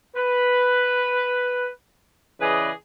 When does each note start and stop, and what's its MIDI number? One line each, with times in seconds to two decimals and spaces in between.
0.15 1.69 71
2.41 2.70 49
2.41 2.70 52
2.41 2.70 68
2.41 2.70 71
2.41 2.70 74
2.41 2.70 75